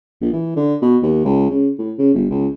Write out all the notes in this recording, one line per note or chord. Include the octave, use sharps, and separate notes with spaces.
A#1
E3
D3
B2
D#2
C#2
C#3
A2
C#3
G1
C#2